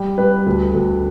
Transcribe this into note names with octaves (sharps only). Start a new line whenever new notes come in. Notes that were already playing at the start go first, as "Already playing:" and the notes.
Already playing: G3
G3 B4
D2
D2